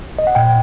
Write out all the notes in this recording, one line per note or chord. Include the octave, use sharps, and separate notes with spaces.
D#5
F#5
A#2 G5